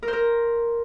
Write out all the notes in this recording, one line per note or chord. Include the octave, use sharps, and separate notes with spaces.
A#4
C5
A#4